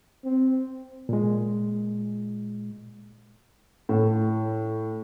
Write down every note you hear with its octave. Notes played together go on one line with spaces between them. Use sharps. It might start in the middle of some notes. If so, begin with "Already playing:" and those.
C4
A#2 G#3
A2